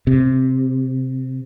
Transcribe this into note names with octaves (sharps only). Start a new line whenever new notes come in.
C3